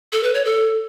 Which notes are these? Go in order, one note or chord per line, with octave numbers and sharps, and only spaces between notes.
A4
B4
C#5
A4